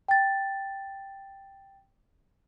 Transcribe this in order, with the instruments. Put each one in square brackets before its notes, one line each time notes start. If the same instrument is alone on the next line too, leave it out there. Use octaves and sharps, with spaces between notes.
[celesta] G5 A6